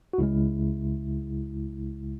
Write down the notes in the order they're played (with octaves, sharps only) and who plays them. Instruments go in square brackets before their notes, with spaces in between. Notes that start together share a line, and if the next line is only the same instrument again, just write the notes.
[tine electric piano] F#4
C#2 C#3 G#3 E4